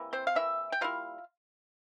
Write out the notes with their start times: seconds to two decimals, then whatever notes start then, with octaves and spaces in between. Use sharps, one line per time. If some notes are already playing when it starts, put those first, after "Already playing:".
Already playing: C3 E3 A#3 E4
0.13 C4 C5
0.27 F5
0.35 C3 E3 A#3 E4 E5
0.72 G5
0.81 G3 A#3 E4 F4 F5